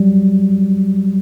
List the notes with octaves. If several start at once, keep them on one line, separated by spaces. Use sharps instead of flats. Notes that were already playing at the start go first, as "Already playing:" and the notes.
Already playing: F#3 G3